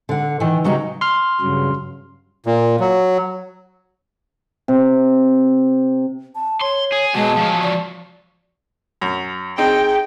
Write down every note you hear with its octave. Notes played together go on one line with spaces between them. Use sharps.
D3 F#5
D#3 E3
C#3 F#3 G3 D#4
C6 F6
G2 C#3 F#3
A#2
F#3
C3
A5
C#5 C6
G#4
B2 F#3 G#3 A5
F3 F#3
D5
F#2
C4 D#4 G#4 G5